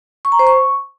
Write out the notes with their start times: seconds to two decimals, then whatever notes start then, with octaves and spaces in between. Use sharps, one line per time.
0.25 C#6
0.32 A#5
0.39 C5
0.47 C#6